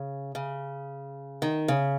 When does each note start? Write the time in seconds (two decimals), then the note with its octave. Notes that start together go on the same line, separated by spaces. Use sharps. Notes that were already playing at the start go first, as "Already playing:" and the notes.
Already playing: C#3
0.35 C#3
1.42 D#3
1.68 C#3